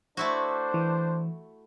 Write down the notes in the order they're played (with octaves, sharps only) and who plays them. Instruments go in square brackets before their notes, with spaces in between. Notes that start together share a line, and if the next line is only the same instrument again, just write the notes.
[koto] A3 E4 F#4 [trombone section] D4 C5
[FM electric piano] E3